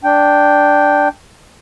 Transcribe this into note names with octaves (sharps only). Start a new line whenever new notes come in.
D4 G5